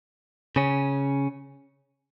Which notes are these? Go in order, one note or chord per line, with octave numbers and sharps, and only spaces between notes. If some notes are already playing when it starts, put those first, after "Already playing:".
C#3 C#4